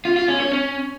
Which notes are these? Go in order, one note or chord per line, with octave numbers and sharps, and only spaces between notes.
F4
F4
C#4
C#5
C#4